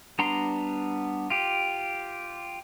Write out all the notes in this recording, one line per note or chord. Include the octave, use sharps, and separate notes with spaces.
G3 B3 D4 A#5 C6
F4 G4